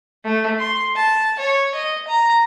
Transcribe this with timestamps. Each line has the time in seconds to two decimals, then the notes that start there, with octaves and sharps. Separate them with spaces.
0.24 A3
0.59 C6
0.96 A5
1.39 C#5
1.75 D#5
2.08 A#5